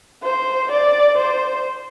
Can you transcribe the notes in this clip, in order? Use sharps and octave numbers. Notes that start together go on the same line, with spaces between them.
C5
D5
C5